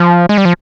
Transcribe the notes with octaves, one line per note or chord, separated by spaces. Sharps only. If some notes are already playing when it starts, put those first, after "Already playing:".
Already playing: F3
G#3
G3
F3